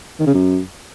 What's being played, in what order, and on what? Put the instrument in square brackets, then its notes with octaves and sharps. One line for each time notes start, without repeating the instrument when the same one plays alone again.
[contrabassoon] D#3
C#3
F#2